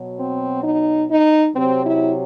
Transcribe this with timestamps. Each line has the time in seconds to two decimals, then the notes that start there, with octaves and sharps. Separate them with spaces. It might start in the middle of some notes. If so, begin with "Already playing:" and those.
Already playing: B2 F#3
0.19 C4
0.63 D#4
1.10 D#4
1.56 C3 F#3 C4
1.85 E4